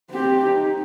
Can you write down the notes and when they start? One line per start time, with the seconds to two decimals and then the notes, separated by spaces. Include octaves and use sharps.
0.11 C4 G4
0.45 D#4